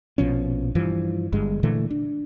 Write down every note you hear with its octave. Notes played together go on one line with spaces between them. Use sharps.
A#1 B2 F3 C#4
G2 E3 F3
G1 G2 G#3
A#2 D3 E3 A3
D4